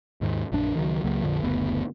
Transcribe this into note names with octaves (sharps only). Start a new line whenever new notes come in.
D#2 G#2 D#3 G#3
A#1 F#2 D4
C#2 D#3 F3 F#3
C#2 F#3 A#3
A#1 F2 D3 F3
F#1 D2 B3